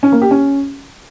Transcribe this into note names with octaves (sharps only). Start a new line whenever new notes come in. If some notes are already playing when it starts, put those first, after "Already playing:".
C#4
A#3
G4
C#4